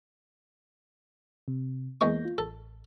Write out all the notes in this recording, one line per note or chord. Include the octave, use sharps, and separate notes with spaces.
C3
E2 G#3 A#3 C#6 G6 A#6
F4
A1 A4